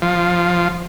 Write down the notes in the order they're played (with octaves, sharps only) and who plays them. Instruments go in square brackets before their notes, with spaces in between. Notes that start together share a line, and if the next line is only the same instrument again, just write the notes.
[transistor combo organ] F3